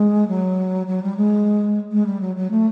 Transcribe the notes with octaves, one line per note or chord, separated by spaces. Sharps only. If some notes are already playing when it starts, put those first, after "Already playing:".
Already playing: G#3
F#3
F#3
G3
G#3
G#3
G3
F#3
F#3
A3